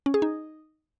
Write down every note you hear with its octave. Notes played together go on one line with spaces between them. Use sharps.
C#4
G#4
D#4